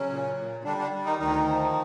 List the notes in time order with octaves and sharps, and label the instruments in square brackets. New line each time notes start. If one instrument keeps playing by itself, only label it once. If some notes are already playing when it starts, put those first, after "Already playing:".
Already playing: [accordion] C#3 F#3 C#4
A#2
A#2
D3 G3 D4
D3 D4
G3
D#3 D#4
D2 D#3 D#4
F3